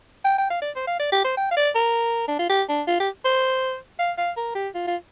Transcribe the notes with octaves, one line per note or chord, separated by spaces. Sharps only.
G5
G5
F5
D5
C5
F5
D5
G4
C5
G5
F5
D5
A#4
D4
F4
G4
D4
F4
G4
C5
F5
F5
A#4
G4
F4
F4